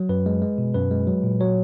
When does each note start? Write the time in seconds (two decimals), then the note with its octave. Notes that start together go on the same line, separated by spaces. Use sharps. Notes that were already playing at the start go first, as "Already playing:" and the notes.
Already playing: F#3
0.09 F#2 B4
0.26 G#3
0.42 G#3
0.58 B2
0.74 F#2 B4
0.91 G#3
1.07 F#3
1.24 A#2
1.40 F#3 C#5